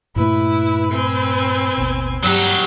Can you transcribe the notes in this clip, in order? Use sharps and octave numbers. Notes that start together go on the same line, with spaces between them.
G2 A#2 A3 E4 B4
C4 G#5
G#1 D#2 B2
G2 F#3 G4